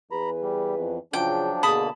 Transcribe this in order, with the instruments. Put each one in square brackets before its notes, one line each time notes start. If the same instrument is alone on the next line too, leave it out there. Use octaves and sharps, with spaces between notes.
[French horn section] E2 G#4 B4 [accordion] A#5 B5
[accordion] G3
F2
[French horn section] C#3 F4 [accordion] F3 F#3 D4 [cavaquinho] G5
[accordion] B2 D3 A#3 [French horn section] G#4 [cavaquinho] A5 B5 D#6